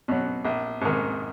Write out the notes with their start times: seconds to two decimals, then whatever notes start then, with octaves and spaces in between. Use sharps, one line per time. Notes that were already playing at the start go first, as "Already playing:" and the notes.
0.08 B2 F#3
0.45 A#1
0.81 G#2 D#3